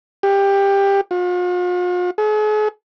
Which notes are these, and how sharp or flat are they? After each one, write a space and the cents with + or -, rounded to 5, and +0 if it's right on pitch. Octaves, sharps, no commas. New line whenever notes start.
G4 +15
F4 +45
G#4 +45